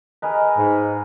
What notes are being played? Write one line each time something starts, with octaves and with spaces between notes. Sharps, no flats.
G#4 A#4 B4 D#5
G#2